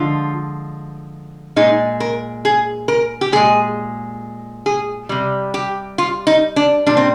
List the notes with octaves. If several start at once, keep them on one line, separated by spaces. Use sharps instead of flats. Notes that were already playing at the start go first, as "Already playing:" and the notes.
Already playing: D3 F3 G#3 F4
A#2 G#3 D#4
A#4
G#4
A#4
G4
A#2 G#3 G#4
G#4
C3 G3
G4
F4
D#4
D4
A#2 G3 D4
C4